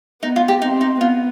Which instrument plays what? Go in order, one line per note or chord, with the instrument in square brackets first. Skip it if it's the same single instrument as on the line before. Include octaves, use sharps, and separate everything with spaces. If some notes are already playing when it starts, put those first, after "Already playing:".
[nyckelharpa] B3 [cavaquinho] D#4
[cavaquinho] F4
G4
[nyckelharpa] C4 [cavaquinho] D#4
[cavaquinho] D#4
[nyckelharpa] B3 [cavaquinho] F4